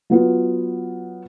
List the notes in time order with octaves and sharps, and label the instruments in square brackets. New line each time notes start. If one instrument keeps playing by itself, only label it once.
[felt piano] F#3 B3 F4